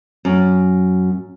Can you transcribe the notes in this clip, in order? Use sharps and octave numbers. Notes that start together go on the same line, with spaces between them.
F#2